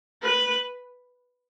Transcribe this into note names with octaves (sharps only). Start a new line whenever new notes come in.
B4